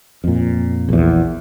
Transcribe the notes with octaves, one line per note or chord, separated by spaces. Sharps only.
F2 A#2
A#1 E2